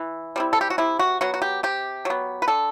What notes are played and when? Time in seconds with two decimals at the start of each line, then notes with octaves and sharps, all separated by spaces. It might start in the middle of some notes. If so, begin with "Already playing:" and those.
Already playing: E3
0.36 G3 C4 E4
0.53 A4
0.61 G4
0.70 F#4
0.78 C3 E4
0.99 F#4
1.21 F#3 B3 F#4
1.34 F#4
1.42 G4
1.63 C3 G4
2.05 F#3 B3
2.42 B4
2.48 D3 A4